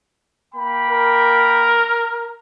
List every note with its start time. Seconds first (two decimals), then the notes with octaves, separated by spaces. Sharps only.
0.55 A#3 G5 B5
0.91 A#4